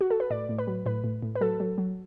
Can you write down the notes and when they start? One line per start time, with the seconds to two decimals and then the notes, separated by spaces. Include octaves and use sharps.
0.01 F#4
0.11 A4
0.20 B4
0.30 A2 D5
0.49 A2
0.59 B4
0.67 F#3
0.86 A2 B4
1.04 A2
1.23 A2
1.36 B4
1.41 F#3 A4
1.60 F#3
1.78 F#3